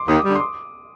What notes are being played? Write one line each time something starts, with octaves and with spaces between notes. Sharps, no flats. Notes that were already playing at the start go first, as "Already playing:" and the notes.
Already playing: C6 D6
D#2 D#6
D6
D3 G3 D#6
C6
D6